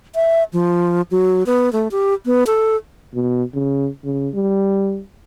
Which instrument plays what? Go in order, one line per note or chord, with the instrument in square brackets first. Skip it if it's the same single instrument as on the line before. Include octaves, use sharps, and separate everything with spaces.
[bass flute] E5
F3
F#3
B3
A3
G4
B3
A4
[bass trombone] B2
C#3
C#3
G3